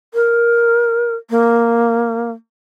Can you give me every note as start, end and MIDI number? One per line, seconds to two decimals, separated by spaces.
0.14 1.15 70
1.30 2.31 58